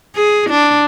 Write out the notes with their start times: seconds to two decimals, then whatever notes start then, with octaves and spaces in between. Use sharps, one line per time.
0.15 G#4
0.50 D4